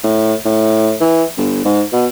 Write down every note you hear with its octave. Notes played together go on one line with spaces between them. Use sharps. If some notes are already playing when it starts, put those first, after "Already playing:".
A2
A2
E3
G1
G#2
B2